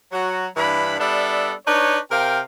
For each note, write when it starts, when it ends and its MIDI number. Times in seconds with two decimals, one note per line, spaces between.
0.12 0.47 54
0.12 0.47 66
0.57 0.96 43
0.57 0.96 52
0.57 0.96 62
0.57 0.96 83
1.00 1.53 55
1.00 1.53 59
1.00 1.53 62
1.00 1.53 69
1.00 1.53 76
1.67 1.99 62
1.67 1.99 63
1.67 1.99 71
1.67 1.99 73
2.11 2.40 48
2.11 2.40 70
2.11 2.40 77
2.11 2.40 79